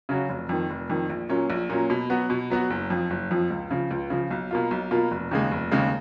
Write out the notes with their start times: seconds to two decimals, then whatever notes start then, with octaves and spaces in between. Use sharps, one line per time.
0.09 C#3 F#3 C#4 F#4
0.29 F1
0.49 F2 D#3
0.70 F1
0.89 F2 D#3
1.09 A#1
1.29 A#2 F#3 C#4
1.50 A#1
1.70 A#2 F#3 C#4
1.90 B2
2.10 F#3 B3 F#4
2.30 B2
2.50 F#3 B3 F#4
2.70 F#1
2.90 F2 F3
3.10 F#1
3.31 F2 F3
3.50 C#2
3.71 C#3 F3
3.91 C#2
4.10 C#3 F3
4.31 B1
4.51 B2 A#3 F4
4.71 B1
4.91 B2 A#3 F4
5.11 F1
5.31 D#2 C#3 G#3
5.51 F1
5.71 D#2 C#3 G#3